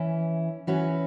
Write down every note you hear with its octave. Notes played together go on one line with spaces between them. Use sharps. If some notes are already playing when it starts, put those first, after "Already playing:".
Already playing: E3 C#4 E4 B4
E3 C#4 F#4 B4